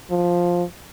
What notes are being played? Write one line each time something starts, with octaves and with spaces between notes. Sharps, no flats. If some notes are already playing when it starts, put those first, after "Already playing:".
F3